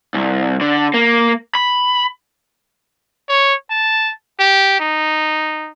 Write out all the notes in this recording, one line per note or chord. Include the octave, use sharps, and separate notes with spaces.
C2
D3
A#3
B5
C#5
A5
G4
D#4